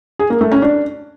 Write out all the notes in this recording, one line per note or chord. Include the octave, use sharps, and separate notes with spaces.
G#4
A#3
A3
C#4
D4